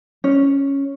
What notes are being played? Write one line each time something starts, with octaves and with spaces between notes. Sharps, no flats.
C#4